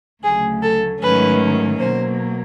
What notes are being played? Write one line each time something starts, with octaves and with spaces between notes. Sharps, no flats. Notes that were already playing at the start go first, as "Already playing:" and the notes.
D2 C#3 F#3 A3 G#4
A4
G#2 D#3 F#3 A3 C#4 B4
B2 F#3 A#3 C5